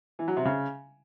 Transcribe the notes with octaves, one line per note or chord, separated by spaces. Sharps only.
E3
F#3
C3
C#3